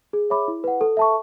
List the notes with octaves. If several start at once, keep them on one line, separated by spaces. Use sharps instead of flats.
G#4
C#5 E5 B5 D6
E4
B4 F#5
A4
E5 A5 C#6